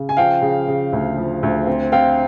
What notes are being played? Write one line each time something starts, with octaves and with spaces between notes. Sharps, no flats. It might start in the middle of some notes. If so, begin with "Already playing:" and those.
Already playing: C#3
G#5
F3 F5 G5
C#3
C#3
D2
F3
D2
C4
C4 F5 G5